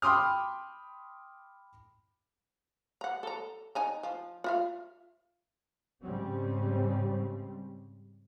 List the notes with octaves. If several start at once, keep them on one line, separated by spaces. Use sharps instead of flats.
G5 B5 C6 D6 D#6 F6
F#5 A#5
A4 A#5
D#4 G#5 A#5
F3
F4 E5 F5
G#2 C#3 G3 C4 C#4